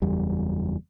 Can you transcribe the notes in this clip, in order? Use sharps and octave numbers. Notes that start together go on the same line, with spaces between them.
F#1 E2 G3